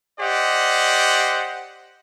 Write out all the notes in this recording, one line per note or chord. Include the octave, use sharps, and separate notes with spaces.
G4 C5 D5 D#5 F#5